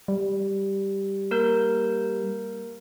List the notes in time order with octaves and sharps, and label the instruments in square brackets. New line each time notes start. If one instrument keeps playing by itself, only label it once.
[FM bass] G3
[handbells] A#3 A#4 G6